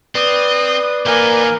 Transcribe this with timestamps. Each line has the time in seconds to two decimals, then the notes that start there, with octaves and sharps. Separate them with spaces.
0.15 C4 B4 D5 D#6
1.06 E3 A#3 D#4 A#4 G#5